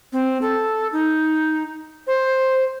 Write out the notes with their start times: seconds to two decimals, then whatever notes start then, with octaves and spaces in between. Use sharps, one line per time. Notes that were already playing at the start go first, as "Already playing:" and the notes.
0.13 C4
0.42 A4
0.92 D#4
2.07 C5